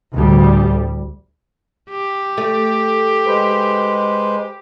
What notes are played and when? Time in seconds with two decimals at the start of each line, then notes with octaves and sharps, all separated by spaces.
0.14 D2 A2 G3
1.90 G4
2.38 A3
3.26 G#3 B4 C5